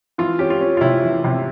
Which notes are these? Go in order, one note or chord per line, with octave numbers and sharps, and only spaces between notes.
E3 F4
C#4 G4
F4
C#4
F4
C3 E4
E3
C3